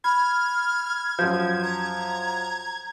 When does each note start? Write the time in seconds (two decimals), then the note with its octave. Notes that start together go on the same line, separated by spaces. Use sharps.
0.04 B5 F6 G#6
1.19 F#2 F3 G6
1.62 A#5